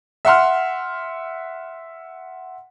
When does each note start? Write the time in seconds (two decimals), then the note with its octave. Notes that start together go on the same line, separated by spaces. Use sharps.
0.25 E5 F#5 C6 F6